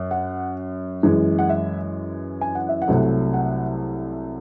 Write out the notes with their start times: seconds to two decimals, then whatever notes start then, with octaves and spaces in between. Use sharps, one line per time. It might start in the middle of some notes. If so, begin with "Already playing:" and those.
Already playing: F#2
0.11 F#5
1.03 F#2 E3 G#3
1.39 F#5
1.49 E5
2.41 G#5
2.55 F#5
2.69 E5
2.82 F#5
2.88 C2 C3 F#3 A3
3.34 F#5